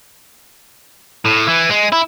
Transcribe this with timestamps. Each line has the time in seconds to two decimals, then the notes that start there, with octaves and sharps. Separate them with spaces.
1.25 A2
1.48 E3
1.70 G#3
1.93 E4